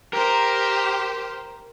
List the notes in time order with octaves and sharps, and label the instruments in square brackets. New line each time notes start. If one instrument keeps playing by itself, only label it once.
[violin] G4 C5 [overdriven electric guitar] A#4